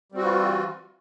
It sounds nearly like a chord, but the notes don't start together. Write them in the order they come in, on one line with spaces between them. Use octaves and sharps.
G3 C4 F#4 E3 F4